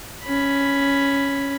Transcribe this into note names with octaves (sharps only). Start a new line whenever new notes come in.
C#4 B5